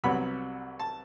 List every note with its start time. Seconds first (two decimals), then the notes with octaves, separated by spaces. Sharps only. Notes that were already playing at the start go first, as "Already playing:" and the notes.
0.04 C2 C3 F#3 B3 B5
0.79 A5